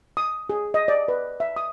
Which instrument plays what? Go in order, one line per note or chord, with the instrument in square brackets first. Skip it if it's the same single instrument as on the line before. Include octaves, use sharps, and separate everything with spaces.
[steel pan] D#6
G#4
D#5
D5
B4
E5
D#6